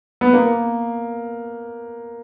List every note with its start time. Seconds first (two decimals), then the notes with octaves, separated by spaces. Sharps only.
0.21 B3
0.34 A#3